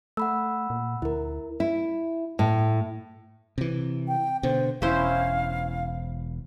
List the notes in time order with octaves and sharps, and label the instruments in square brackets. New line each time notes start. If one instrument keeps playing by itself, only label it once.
[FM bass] A3 [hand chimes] F#5 B5 E6
[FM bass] A#2
[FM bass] D2 [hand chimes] E4 A#4
[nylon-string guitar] E4
A2
[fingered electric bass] C3 E3
[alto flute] G5
[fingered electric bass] B2 D3 [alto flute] C5
[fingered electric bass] E1 [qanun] C#4 E4 C5 [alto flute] F5